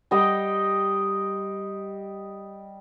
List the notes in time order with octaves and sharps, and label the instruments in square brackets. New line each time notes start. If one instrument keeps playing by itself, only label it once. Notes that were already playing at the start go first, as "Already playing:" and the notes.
[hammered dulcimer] G3 D#5 G5